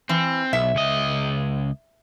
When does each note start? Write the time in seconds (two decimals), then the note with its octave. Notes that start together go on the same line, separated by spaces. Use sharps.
0.09 E3 C4
0.53 B1 E5
0.75 C#2 D#5